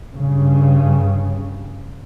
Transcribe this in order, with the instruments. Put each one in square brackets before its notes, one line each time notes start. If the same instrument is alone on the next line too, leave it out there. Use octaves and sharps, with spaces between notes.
[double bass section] G2 C#3